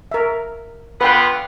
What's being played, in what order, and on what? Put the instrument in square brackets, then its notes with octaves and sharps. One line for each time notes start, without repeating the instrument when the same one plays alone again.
[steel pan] A#4 E5
[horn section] D3 B3 F4 [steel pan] B4 G5